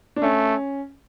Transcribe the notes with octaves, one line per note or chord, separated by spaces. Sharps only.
D4
A3 C#4